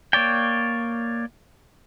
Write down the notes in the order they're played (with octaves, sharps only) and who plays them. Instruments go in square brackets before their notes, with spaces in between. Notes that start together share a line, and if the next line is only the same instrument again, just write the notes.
[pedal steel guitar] A#3 C#5 D5 G5